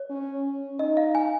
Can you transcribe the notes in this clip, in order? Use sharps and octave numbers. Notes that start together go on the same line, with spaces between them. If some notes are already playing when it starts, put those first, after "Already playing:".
Already playing: C#5
C#4
C#4
D#4 D#5
F5
G#5